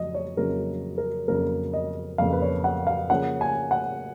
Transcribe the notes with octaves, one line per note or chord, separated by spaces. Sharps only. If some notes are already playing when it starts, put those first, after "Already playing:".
Already playing: F2 C#3 F#3 D#5
C#5
F2 C#3 F#3 A#3 A#4
A#4
F2 C#3 F#3 A#3 A#4
D#5
F2 C#3 F#3 A#3 F5
B4
C#5
F#5
F5
C#3 F3 A#3 C#4 F#5
G#5
F#5